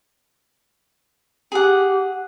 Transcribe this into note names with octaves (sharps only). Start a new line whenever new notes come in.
G4 G#4 F#5